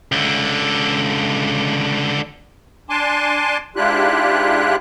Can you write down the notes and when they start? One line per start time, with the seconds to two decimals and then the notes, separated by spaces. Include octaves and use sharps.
0.12 C#2 D3
2.89 D4 G#5 A5 C6 D6
3.76 G#2 D4 E4 F4 G4 F#6